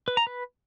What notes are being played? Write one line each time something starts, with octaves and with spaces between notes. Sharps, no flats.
B4
A#5
B4